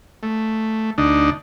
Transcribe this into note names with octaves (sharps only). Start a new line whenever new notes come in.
A3
D2 D4 D#4